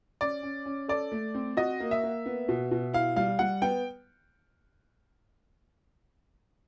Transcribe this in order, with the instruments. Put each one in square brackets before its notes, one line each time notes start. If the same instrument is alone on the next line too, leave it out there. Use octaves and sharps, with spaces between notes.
[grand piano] C#4 [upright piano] D5
[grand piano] C#4
C#4
[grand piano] A4 [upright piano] D5
[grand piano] A3
C4
[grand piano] F#4 [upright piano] D#5
[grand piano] A#3
[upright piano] E5
[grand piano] A#3
B3
B2
B2
[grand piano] E4 [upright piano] F5
[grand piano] G3 [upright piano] F5
[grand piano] G3 [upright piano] F#5
[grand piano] B3 [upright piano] G5